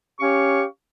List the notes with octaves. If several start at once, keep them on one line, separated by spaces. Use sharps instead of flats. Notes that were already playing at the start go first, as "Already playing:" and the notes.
C#4 G4 C#5 F5 C#6